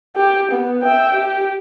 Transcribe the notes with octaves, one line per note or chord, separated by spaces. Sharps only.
G4
B3
E5 G5
G4